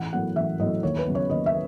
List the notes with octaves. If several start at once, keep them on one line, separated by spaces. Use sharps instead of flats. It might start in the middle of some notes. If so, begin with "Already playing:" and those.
Already playing: A1 F#5
A2 F#3 B3 F#5
A1 E5
A2 F#3 B3 D#5
D#2 C#5
B4
C#3 F#3 B3
C#5
D#2 D#5
E5